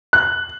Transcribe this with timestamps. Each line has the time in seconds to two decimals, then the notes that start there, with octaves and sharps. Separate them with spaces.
0.13 F#6